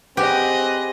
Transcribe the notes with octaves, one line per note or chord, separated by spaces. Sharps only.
C4 G4 G#4 B4 D#5 F#5